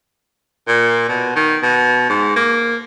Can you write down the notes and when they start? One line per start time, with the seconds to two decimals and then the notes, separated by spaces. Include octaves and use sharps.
0.68 A#2
1.09 B2
1.36 D#3
1.63 B2
2.09 G#2
2.36 A#3